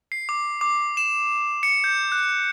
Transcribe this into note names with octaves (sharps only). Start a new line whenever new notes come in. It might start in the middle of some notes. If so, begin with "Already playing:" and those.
C7
D6
D6
E7
C#7
G6
F#6